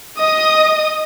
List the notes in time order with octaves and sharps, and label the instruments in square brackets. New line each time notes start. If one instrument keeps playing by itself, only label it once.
[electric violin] D#5 D#6